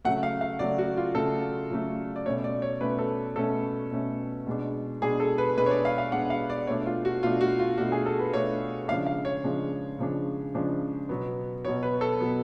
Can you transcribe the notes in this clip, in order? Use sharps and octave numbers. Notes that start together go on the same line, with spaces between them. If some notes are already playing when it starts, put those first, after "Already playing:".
C#3 F#3 A3 F#5
F5
F5
C#3 F#3 A3 D5
F#4
F4
C#3 F#3 A3 A4
C#3 F#3 A3
D5
B2 A3 C#4 C#5
D5
C#5
B2 A3 C#4 B4
A4
B2 A3 C#4 A4
B2 A3 C#4
B2 G#3 D4
B2 G#3 D4 G#4
A4
B4
B2 G#3 D4 B4
C#5
D5
F5
F5
B2 G#3 D4 F#5
F5
D5
B2 A3 D4 C#5
F4
F#4
B2 A3 D4 F4
F#4
F4
B2 A3 D4 F#4
G#4
A4
B4
B2 A3 D4 C#5
C#3 F3 G#3 D4 F5
F5
C#5
C#3 F3 G#3 D4
C#3 F3 G#3 D4
C#3 F3 G#3 D4
B2 F#3 B3
B2 F#3 B3 C#5
B4
A4
B2 F#3 B3